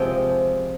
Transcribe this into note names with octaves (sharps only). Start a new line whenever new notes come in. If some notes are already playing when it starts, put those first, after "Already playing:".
Already playing: C3 F3 G#3 G5